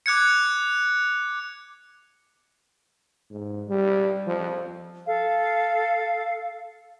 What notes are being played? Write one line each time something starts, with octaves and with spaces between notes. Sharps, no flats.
D6 F#6 G#6 C#7
G#2
G3
F3
A4 F5